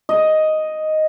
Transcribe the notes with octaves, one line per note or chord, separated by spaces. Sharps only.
D#5